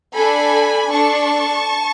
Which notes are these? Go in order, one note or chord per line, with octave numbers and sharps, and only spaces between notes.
D4 A4 G#5 B5
D4 A4 A5 C#6